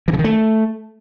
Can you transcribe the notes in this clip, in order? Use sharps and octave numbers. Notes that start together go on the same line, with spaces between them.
E3
C#3
D#3
A3